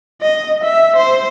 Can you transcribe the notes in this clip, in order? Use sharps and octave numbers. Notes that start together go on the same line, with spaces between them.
D#5
E5
C5